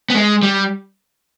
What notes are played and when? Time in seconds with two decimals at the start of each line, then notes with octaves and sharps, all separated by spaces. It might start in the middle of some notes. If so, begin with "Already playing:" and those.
0.10 B3
0.15 G#3
0.43 G3